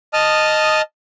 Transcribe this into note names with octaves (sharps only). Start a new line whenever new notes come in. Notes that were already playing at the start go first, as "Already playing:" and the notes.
D#5 A5 D#6 F6